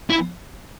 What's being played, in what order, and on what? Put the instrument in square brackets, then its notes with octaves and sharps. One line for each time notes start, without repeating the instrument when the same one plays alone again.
[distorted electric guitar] E4